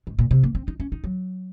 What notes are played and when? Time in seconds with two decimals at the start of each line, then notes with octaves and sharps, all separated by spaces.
0.07 G#2
0.19 A#2
0.31 C3
0.44 A#3
0.55 C4
0.68 D#4
0.80 C#4
0.92 D#4
1.04 F#3